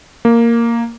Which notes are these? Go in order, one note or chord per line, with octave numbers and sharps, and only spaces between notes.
A#3